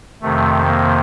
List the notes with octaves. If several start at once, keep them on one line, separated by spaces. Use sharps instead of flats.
F2 C3 D#3 A3
A#3